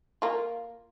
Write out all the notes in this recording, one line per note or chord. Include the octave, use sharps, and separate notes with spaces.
A#3 F4